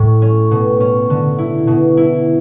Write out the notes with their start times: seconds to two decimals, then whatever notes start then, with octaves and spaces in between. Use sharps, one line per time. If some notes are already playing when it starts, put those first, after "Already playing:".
Already playing: A2
0.22 C#4
0.51 B2
0.80 C#4
1.10 D3
1.38 E4
1.67 B2
1.97 E4